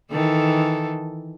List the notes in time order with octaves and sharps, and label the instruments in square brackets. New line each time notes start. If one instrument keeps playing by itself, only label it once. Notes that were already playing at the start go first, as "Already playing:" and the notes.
[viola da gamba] D#3 E3 A4